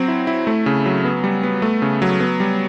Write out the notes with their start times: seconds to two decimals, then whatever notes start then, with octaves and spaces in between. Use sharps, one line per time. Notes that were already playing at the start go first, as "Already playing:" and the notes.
Already playing: F#3 C4
0.08 E4
0.27 E4
0.47 A3
0.66 C#3
0.86 F#3
1.05 B3
1.24 G3
1.43 B3
1.62 A3
1.82 C#3
2.02 F#3
2.20 B3
2.40 G3